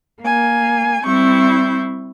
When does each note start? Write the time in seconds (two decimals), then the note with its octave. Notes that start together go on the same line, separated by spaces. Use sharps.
0.22 A#3 G#5
1.04 G3 C4 E4 C#6 G6